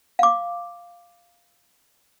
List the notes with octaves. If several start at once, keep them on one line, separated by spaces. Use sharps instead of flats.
F5 D6